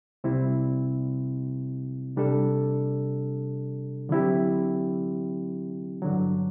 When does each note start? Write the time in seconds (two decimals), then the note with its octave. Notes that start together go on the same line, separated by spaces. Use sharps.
0.24 C2 C3 G3 C4 E4
2.17 C3 G3 D4 A4
4.09 D3 F#3 C4 E4 G4
6.02 G2 D3 F#3